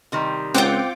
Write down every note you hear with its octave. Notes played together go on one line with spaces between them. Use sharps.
C3 D#3 G3
C#2 C4 F4 F#5 G5 D6